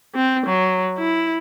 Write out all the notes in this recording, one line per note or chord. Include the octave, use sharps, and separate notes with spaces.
C4
F#3
E4